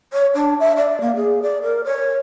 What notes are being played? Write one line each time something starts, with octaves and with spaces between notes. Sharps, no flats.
C#5
D4
E5
D5
A#3
G#4
D5
A#4
C#5